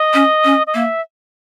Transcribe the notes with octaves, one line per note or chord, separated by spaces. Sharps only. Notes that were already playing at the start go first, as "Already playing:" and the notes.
Already playing: D#5
C#4
C#4
D#5
A#3 E5